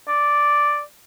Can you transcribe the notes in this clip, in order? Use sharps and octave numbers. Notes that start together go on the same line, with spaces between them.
D5